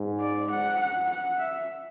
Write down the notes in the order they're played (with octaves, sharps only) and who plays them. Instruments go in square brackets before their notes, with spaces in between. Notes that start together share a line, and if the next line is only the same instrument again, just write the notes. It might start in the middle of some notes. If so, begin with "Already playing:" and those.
Already playing: [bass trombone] G#2
[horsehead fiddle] D5
F#5
F#5
F#5
E5